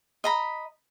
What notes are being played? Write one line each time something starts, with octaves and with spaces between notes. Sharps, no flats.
D#5 A#5 B5